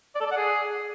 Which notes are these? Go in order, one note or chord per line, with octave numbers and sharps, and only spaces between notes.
D5
A4
D5
F#5
G#4